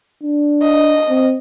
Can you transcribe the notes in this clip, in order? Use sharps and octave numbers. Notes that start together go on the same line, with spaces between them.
D4
D#5
C4